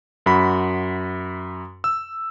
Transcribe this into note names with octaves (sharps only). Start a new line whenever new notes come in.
F#2 F#4 B5
E6